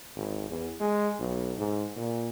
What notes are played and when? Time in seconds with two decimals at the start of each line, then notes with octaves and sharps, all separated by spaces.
0.16 G#1
0.49 E2
0.80 G#3
1.19 B1
1.58 G#2
1.96 A#2